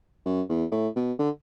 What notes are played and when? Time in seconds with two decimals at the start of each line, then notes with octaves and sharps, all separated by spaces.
0.25 F#2
0.49 E2
0.72 A2
0.96 B2
1.19 D3